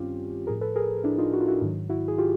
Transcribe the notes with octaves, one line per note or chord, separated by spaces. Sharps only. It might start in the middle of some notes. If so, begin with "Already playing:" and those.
Already playing: G2 D#3 G3 C4 C#4 F4 G4
A2 F3 G#4 A#4
A4 B4
G#4 A#4
D4 E4
D#4 F4
F#4
F4
E4 F#4
G#2 D#3 F#3
E4 F#4
G#4
F4 G4